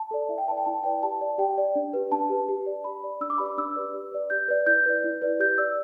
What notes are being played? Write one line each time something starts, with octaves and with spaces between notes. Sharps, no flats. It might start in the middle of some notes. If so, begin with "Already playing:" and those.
Already playing: A5
A4 D5
E4 E5
G5
B4 D5 A5
G5
E4 A5
B4 D5 G5
G4 A5
D5
G4 G5
D5
D4
G4 B4
D4 A5
G4 B4
G4
D5
G4 B5
D5
D4 E6
D6
G4 B4 D5 B5
D6
D4 E6
G4 B4 D5
G4
B4 D5
G4 G6
B4 D5
E4 G6
B4 D5
E4
B4 D5
G4 G6
D5 E6